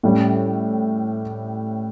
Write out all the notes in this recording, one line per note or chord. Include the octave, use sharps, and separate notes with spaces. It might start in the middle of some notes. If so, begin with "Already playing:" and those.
A2 G3 C#4